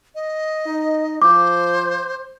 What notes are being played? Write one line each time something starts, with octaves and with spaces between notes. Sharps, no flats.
D#5
D#4
F3 C5 D6